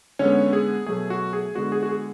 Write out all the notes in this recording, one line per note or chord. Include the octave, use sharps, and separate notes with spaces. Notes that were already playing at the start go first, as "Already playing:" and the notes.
D3 G#3 B3 C#4 C#5
G#4
B2 F#3 A3 G#4
F#4
G#4
D3 G#3 B3 F#4
G#4
F#4
G#4